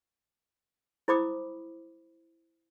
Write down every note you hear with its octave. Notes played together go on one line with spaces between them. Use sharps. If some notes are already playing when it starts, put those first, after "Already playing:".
E4 C5 B5 D6 D#6